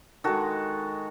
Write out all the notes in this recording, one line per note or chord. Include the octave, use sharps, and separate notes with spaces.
D#3 G#3 F#4 A4